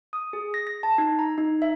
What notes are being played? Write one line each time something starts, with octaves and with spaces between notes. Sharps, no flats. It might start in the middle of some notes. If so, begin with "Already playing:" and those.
D#6
G#4
A#6
A#6
A5
D#4
A#5
D#4
E5